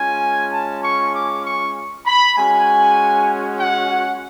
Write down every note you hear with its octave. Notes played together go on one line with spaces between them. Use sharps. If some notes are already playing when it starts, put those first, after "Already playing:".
Already playing: G#3 C#4 F4 G#5
A5
C#6
D6
C#6
B5
G#3 C#4 F#4 G#5
F#5